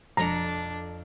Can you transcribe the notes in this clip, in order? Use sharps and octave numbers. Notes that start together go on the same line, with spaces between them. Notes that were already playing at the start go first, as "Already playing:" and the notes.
E1 F2 D4 A4 A#5 C#7